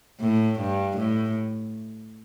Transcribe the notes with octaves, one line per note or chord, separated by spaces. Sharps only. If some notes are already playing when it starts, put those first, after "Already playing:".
A2
G2
A2